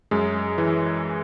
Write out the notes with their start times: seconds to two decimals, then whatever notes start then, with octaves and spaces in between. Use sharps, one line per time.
0.11 F#2 G#3
0.58 E3